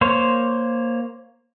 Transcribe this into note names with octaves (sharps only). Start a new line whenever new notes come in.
A#3 C5 C#5